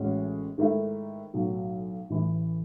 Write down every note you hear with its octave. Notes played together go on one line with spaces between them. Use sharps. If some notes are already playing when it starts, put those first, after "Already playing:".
Already playing: A1 A2 G#3 C#4 F#4
G#2 D#3 A3 E4
B1 A2 F#3
A1 A2 E3